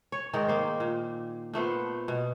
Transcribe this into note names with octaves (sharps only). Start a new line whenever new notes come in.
C#5
G#2 D#3 D#4 A#4
A#3 C5
A#2
A#2 A3 B3 C5
B2